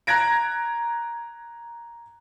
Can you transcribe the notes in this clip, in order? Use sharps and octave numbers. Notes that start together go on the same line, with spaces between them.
A#5 F#6 G#6 A#6 D7